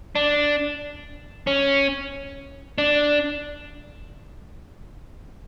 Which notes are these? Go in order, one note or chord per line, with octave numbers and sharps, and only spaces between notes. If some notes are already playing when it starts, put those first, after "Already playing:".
D4
C#4
D4